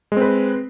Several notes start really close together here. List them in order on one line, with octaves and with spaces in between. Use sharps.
G#3 C4 B4